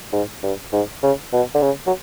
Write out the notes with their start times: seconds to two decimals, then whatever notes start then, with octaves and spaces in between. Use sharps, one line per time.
0.13 G#2
0.43 G2
0.73 G#2
1.03 C#3
1.33 B2
1.54 D3
1.62 C#3
1.87 F#3